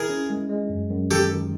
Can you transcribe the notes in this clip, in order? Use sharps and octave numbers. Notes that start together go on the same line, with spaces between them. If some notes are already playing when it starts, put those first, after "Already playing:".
Already playing: E4 G#4 A#4
C#4
G#3
G#3
F#2
F#2
D#3 G4 A4
D#3